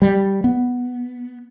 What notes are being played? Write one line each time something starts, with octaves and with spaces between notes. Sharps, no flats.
G3
B3